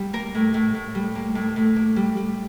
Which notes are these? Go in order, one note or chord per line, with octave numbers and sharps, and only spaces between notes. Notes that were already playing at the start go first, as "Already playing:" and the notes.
Already playing: G3
A#3 A#4
A2
A2
A2
G3
A#3
A2
A2
A#3
G3
G3